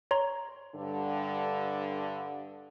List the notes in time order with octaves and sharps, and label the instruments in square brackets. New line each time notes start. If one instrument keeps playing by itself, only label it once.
[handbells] C#5 A#5 C6
[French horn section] G2 D3